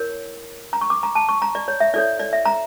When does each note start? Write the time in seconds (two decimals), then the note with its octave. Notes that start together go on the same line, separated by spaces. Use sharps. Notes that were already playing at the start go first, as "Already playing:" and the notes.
Already playing: E4 A#4 C#5
0.73 A#5
0.81 C#6
0.90 D6
1.03 A#5
1.15 A5
1.29 C#6
1.42 A#5
1.55 D5
1.68 C#5
1.80 E5
1.94 E4 A4 C#5 D5
2.19 D5
2.33 E5
2.45 A#5